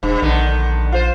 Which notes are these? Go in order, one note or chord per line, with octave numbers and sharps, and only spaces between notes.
E1 G2
A#1 D3 D#3 B3
F4 C5